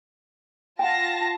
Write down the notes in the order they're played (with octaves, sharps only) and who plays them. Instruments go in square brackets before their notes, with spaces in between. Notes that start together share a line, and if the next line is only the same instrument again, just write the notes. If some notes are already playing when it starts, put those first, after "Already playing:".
[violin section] F4 A5 A#6 [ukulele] F#5 G5